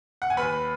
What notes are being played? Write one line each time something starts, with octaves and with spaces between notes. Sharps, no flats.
F#5
G#5
D#2 B4 B5